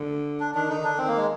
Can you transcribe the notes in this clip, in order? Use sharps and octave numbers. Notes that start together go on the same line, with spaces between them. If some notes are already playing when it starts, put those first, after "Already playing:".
Already playing: D3
D4
D#3 D4
D3 D#4
D#3
D3 D4
D#3 C4
A#3
G#3